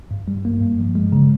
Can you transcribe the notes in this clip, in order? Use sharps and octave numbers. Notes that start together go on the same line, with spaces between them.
G2
G3
A#3
G2
F3
G#3
C#3